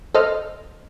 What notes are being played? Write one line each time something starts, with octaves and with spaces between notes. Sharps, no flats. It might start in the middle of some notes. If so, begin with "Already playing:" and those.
A4 C5 D#5 F6